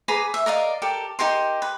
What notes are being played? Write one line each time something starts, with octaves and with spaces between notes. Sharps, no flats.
G#4 B4 A#5 D6
E5
A#4 D5 D#5 F5
G4 A4 A#4
D#4 G4 A#4 C6
B4